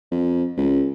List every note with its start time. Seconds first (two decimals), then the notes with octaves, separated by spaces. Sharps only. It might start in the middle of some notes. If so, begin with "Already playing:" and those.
0.11 F2
0.57 C#2